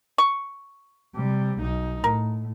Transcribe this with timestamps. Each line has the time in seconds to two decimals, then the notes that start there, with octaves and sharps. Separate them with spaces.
0.18 C#6
1.16 C3 G3
1.60 B1 D#4
2.04 A2 A#4